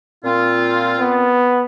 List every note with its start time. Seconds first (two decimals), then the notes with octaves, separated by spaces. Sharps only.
0.24 A#2 C4 F4
0.99 B3